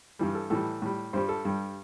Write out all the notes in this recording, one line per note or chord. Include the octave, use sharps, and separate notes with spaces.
G2 E3 G3
A4
A2 E3 G3 A4
A2 G3
G2 G3 C5
A4
G2 G3